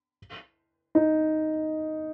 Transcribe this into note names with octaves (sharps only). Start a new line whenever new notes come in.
D#4